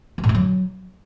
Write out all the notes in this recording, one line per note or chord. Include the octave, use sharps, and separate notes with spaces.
D#3
A2
A3
F#3